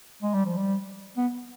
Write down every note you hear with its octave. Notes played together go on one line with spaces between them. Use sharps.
G#3
G3
F3
G3
B3